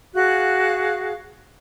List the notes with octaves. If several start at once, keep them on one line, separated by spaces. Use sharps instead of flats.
F#4 G#4 F5 F#6